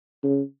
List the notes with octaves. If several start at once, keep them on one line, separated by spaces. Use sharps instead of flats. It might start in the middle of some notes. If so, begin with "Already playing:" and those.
C#3